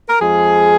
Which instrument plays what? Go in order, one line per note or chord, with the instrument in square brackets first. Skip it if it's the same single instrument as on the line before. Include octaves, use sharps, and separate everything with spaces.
[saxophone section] A#4
F2 F3 G#3 G#4